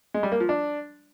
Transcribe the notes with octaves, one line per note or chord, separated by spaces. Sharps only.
G#3
G3
A#3
F3
D4